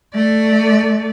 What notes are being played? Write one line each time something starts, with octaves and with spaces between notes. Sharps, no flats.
A3 D5